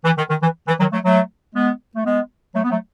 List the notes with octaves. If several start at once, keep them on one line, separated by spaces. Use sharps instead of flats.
E3
D#3
D#3
E3
E3
D#3 F#3
F#3 A3
F#3 A3
G#3 B3
A3
G#3 B3
F#3 A3
B3
F#3 A3